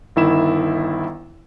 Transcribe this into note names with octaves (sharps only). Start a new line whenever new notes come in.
G1 D#3 E4 E5 E7